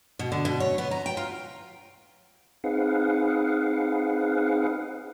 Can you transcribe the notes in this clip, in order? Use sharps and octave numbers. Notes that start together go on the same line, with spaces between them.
B2
D3
B2
C#5
B3
A#5
G5
F4
C4 D#4 G#4 B4 F5 F#5